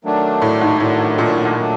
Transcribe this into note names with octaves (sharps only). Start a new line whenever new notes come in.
D#3 F#3 A3 D4
A2
G#2
A2 D#3 F#3 A3 D4
A#2
A2
A#2
D#3 F#3 A3 D4